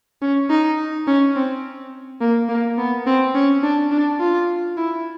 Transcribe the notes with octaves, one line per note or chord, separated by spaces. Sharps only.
C#4
D#4
C#4
C4
A#3
A#3
B3
C4
C#4
D4
D4
F4
E4